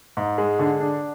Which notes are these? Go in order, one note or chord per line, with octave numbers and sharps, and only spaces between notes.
G#2
G#3
D3
D4